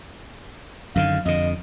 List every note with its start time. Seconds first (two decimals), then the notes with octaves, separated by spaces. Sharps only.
0.95 F#2 D3 D#3 F5
1.25 F2 D3 D#5